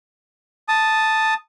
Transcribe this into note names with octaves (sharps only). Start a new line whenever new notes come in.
A5 D#6